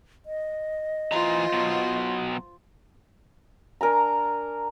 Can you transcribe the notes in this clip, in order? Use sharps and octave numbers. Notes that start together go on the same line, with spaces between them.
D#5
E3 F4 C5 A#5
B2 F#3
D4 A#4 G#5 A#5